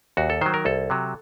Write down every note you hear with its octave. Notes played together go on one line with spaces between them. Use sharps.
D#2 F#4
A4
D#3 F#3 C5
A#4
C2 A4
C3 F#3